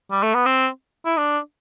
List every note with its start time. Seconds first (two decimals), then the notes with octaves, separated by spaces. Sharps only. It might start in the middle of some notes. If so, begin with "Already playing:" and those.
0.12 G3
0.23 A3
0.35 B3
0.46 C4
1.06 E4
1.17 D4